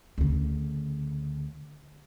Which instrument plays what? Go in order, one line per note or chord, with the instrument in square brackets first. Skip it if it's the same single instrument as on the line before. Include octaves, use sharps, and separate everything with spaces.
[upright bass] D2 C#3